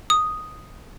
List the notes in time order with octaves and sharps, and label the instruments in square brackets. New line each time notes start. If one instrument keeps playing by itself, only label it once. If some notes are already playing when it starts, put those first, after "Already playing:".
[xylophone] D#6